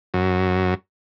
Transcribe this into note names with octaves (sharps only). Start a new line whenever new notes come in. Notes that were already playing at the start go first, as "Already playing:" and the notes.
F#2